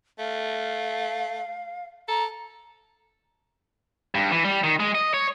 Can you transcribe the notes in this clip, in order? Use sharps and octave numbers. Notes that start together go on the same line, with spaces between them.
A3 F5
A4 A#5
G2
E3
G3
D#3
G#3
D#5
C#5